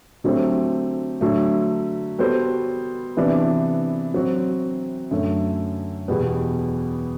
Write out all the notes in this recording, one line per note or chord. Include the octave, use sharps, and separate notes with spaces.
D3 F#3 A3 C4 G4
D3 F#3 A3
G3 B3 F#4 A4 C5
C3 E3 B3 D4
F#3 C4 F#4
F#2 D3 A3
E2 B2 G3 B3